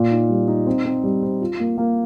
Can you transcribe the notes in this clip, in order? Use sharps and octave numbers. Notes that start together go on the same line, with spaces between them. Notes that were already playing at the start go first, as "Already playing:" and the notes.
Already playing: A#2
D#4
G3
D#4
C4
C4
G3
C4
F4
A#3
A#3